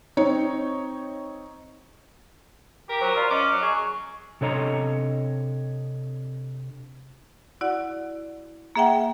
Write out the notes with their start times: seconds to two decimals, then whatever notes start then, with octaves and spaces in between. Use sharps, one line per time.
0.17 C4 D#4 C#5
2.89 G4 A#4
3.01 F#3 C5
3.16 F4 D5
3.30 C#4 D#5 D6
3.51 F#3
3.62 G#4 C#6
4.41 C3 D4 A4 C#5 D#5 A#5
7.61 E4 F#4 D5 F#5
8.76 A#3 G#4 E5 F#5 G5